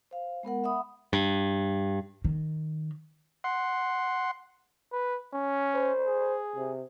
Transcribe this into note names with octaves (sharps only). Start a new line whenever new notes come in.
C5 F5
G#3 B3 A#4 F#5
E5 F#5 B5 D#6
G2
D#3
F#5 C6
B4
C#4
C5
G#4
C3